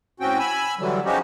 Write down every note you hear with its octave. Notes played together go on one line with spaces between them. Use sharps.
A2 C4 C#4 F#4 G5
G#5 B5 E6
D3 E3 F#3 G3
F3 G#3 C#4 D#4 F#4 G4